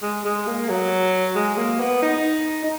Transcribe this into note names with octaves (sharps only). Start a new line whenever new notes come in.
G#3
G#3
A#3
F#3
G#3
A#3
B3
D#4
D#4